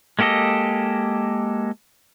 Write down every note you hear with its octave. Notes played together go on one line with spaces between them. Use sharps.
G#3 A#3 G4 A4 D#5